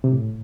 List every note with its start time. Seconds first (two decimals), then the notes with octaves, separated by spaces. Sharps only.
0.04 C3
0.12 A2